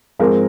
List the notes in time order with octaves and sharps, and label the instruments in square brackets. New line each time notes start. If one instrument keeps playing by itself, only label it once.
[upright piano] G#2 F3 G#3 C4 A#4